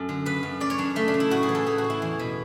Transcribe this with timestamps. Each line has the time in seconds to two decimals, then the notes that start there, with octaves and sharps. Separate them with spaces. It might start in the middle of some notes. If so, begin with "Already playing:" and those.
Already playing: F#2 A4
0.09 D3
0.26 C#3 B4
0.43 F#2
0.60 F#2 D5
0.70 C#5
0.78 F#2 D4
0.96 C#3 A3
1.08 D4
1.14 C#3
1.20 E4
1.30 A2 F#4
1.43 G#4
1.49 E3
1.55 A4
1.66 A2 G#4
1.78 F#4
1.84 E3
1.90 E4
2.02 E2
2.19 B2